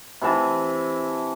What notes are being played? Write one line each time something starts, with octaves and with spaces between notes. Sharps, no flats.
C3 E3 E5 A5